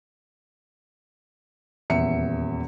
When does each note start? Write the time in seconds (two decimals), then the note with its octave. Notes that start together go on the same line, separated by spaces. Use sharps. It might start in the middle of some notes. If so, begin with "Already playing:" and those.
1.90 D#1 E2 E5 C#7